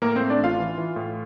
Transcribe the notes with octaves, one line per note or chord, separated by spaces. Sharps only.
A2 A#3 A#4
A3 C4 C5
D4 D5
A1 F4 F5
E3
E3
A2